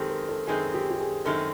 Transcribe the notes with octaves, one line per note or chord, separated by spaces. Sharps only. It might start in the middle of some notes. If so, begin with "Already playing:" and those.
Already playing: F#2 D#3 G#3 C4 G4 A4
A#4
A4
F#2 D#3 G#3 C4 G#4
G4
G4
G#4
F#2 D#3 G#3 C4 A4